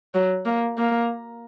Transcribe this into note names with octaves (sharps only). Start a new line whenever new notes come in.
F#3
A#3
A#3